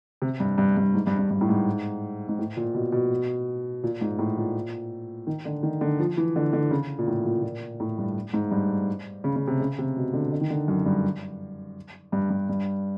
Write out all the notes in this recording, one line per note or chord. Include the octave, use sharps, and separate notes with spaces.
C3
G2
G2
G2
G#2
G2
G2
G2
A2
G#2
G#2
A2
A#2
B2
B2
A#2
G#2
A2
A#2
D#3
D3
D#3
D3
F3
E3
D3
D3
C#3
A#2
A2
A#2
A#2
A2
G2
G#2
G2
C#3
C#3
C3
C#3
C3
B2
D3
D3
D#3
D3
F#2
G2
G2
G2
G2